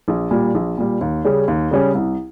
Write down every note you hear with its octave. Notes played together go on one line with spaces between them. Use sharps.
A#1
A#2 G3
A#1
A#2 G3
D#2
C#3 G3 C#4 G#4
D#2
C#3 G3 C#4 G#4
C2